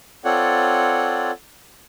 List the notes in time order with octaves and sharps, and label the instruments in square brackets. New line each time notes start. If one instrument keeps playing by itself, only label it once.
[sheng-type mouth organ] C4 F4 A4 C#5 D5 F#5